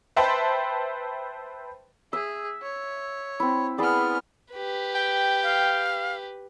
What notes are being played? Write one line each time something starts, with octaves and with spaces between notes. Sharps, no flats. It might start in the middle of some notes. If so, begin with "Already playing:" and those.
B4 C5 E5 G5 A5 B5
G#4 E5
C#5
C4 E4
B3 E4 G#4 D5 F6
G4 B4
G5
F5